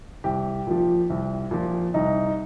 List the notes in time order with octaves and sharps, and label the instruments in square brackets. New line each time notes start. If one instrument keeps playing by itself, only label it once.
[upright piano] C2 G4
A#2 F3
C2
A#2 F3
C2 D#4